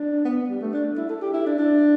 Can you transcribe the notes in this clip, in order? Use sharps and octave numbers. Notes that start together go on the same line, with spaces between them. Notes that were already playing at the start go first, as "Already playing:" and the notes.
Already playing: D4
B3
G3
A3
D4
E4
A4
G4
E4
D4
D4